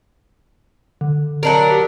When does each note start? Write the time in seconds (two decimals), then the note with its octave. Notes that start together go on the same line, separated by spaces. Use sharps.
1.01 D3
1.43 F#3 D4 A#4
1.70 G4